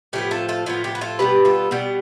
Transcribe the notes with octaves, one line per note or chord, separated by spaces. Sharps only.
A2 F3 B3 G4
F4 A4
F4 A4
A2 F3 B3 F4
G4
B4
F4 A4
B2 G3 B3 G4 B4
F4 A4
B2 G3 B3 G4